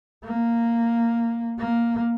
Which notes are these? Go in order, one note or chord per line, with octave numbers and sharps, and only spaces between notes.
A#3
A#3